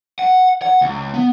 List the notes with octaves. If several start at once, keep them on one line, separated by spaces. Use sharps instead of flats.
F#5
F#5
C#2
B3